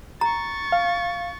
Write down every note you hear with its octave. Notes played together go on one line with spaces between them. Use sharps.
A#5 C#6 A6
F5